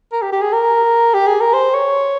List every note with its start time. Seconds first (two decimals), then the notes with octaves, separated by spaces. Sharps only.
0.12 A#4
0.22 G4
0.32 G4
0.42 G#4
0.52 A#4
1.14 G4
1.27 G#4
1.40 A#4
1.54 C5
1.74 C#5